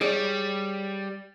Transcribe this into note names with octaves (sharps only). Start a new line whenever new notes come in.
G3 G#4 C#5 D5